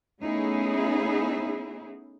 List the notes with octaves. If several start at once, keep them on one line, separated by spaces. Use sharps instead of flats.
A3 B3 C#4 D#4 E4 G#4